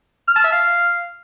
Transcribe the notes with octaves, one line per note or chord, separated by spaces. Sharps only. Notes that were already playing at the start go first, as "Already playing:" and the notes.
F6
A5
E5
F5